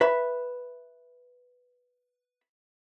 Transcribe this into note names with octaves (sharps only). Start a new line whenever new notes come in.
B4 E5 B5